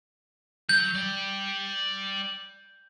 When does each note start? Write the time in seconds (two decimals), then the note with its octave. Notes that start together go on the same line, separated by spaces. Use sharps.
0.69 F#3 G6
0.95 D5 G5